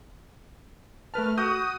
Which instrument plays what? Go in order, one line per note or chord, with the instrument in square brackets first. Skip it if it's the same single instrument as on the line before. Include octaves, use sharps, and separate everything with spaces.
[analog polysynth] A3 F6 [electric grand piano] A#4 B4 A5
[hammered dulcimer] F#4 [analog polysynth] D#6 [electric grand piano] G6